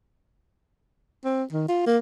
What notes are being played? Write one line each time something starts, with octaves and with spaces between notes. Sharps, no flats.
C4
D#3
F4
A#3